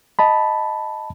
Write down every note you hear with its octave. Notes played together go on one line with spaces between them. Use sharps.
D#5 A5 B5